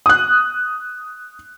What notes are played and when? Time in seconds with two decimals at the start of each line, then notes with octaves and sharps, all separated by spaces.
0.06 D#6 F#6